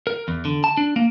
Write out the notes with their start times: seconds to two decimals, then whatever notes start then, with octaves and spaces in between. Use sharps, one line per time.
0.07 A#4
0.28 E2
0.45 D3
0.64 A5
0.77 D4
0.96 A#3